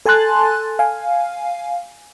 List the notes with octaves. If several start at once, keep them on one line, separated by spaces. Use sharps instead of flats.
A4 G#5 A5 C6 F#6 A6
F5 G#5